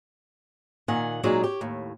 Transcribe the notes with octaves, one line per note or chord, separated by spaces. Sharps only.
A#2 D#3 F#5 G#5
A#2 F#3 G#3 D#4 D5
G4 C#5
D#2 A2